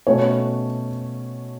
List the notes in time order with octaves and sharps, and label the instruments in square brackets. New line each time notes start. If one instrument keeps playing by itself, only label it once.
[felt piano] B2 A3 C#4 C#5